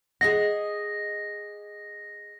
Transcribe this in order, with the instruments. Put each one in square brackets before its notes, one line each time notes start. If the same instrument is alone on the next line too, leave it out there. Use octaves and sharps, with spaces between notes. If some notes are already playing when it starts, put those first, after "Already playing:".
[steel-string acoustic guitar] G#4 D#5 F#5 [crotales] A#6